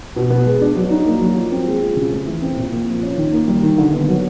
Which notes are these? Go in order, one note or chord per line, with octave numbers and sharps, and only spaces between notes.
B2
B3
G#3
D4
F#3
D#4
A#3
F#3
F3
C4
G#3
F4
C#3
A3
E3
C4
A#2
A#3
F3
C#4
D#3
A#3
G3
D#3
D3
B3
F#3